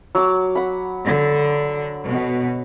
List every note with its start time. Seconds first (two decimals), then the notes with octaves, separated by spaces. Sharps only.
0.15 F#3 D6
0.55 F#5 B5
1.03 D3
2.08 B2